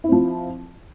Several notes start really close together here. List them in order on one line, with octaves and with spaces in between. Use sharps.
E4 C4 F3